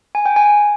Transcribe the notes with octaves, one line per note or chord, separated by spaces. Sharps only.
G#5
G5
G#5